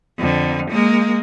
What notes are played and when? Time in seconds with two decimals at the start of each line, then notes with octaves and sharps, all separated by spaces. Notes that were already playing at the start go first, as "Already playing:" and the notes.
0.19 F2 D3
0.71 G#3 A#3